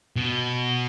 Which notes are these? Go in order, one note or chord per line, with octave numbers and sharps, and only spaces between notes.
B2